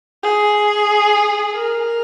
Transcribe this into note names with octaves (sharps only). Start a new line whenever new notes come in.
G#4
A#4